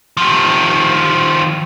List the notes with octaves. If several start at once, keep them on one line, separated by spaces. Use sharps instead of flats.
D#3 F3